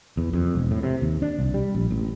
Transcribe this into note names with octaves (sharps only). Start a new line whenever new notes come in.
E2
F2
E1
A2
C3
D#2
D4
C2
G3
A#1
A1